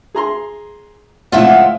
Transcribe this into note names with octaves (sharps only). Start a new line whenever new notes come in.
G#4 A#5 C6
C#2 A2 F3 E4 F4 F#5